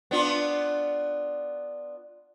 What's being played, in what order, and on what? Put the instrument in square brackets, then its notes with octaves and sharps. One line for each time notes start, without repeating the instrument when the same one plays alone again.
[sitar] B3 D4 F4